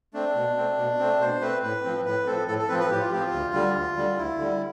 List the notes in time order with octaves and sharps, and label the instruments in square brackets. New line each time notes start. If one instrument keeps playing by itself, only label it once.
[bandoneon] A3 C4 D4
B2
A3 C4
B2
A3 C4
B2 C5
A3 C4 B4
A2 B4
F3 C4
A2 B4
F3 C4 A4
A2 A4
A4
F3 C4 B4
B4
A2 G4
F4
F3 C4 G4
F4
D2
D3 G3
D2
D3 G3
D2 E4
D3 G3